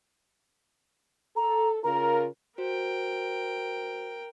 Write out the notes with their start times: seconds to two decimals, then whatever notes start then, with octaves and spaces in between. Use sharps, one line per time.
1.36 A4 A#5
1.83 C#3 F4 A#4 A#5
2.58 F#4 A#4 C5 G5